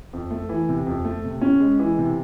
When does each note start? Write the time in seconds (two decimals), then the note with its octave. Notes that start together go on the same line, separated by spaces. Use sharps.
0.13 F2
0.31 A3
0.49 E3
0.69 C3
0.87 F2
1.05 A3
1.24 C3
1.41 C#4
1.60 G#3
1.79 E3
1.98 C3